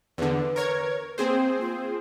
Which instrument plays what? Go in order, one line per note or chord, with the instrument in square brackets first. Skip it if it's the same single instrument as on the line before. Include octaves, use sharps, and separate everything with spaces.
[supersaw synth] E2 D3 [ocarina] B4
[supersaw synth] A#4 C#5 G#6
[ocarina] A#3 [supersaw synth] C4 G#4 C5
[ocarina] F4